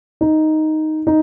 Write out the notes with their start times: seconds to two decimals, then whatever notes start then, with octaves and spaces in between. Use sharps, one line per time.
0.21 D#4
1.07 D#4